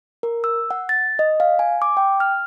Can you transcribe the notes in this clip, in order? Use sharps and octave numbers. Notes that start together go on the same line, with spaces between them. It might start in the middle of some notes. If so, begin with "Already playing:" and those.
A#4
E6
F#5
A6
D#5
F5
G#5
D6
G5
F6